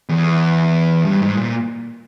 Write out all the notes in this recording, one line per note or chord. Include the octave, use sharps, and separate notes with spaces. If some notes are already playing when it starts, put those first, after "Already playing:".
E2
G2
G#2
A#2